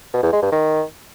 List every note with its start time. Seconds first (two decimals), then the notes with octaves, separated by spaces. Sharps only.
0.13 B2
0.23 E2
0.33 G#3
0.43 G2
0.52 D#3